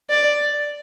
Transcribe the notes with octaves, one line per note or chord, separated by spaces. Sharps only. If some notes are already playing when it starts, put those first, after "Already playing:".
D5